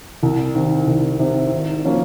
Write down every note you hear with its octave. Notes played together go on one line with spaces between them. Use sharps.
C2
C3 D#3
C2
C3 D#3
G#1
F3 A#3 C#4